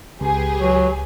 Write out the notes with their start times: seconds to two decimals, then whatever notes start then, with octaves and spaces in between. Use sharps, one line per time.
0.21 C#2 G4 G#4 B4
0.58 F#3